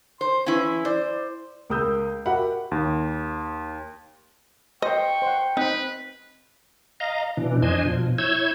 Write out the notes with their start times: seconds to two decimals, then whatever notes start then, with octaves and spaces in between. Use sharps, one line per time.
0.21 C5 C6
0.46 E3 C#4 E4
0.85 C5 D5
1.70 C#2 A#4 B5 D#6 E6 G6
2.26 F#4 G4 A#4 E5 F#5 B5
2.71 D#2
4.82 C5 D#5 G5 C#6
5.22 C5 F#5
5.57 C4 D#4 B4
7.00 D#5 F5 A#5
7.37 B2 E3 D4
7.62 F2 D4 C5 D#5 G#5
7.85 B2 F3
8.18 E4 C#5 E6 G6 G#6